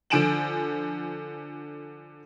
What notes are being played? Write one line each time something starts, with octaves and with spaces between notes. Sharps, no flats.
D3 F3 G#5 D7 E7 F#7